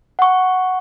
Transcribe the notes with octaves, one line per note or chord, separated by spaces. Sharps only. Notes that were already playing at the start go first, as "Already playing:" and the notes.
F#5 C#6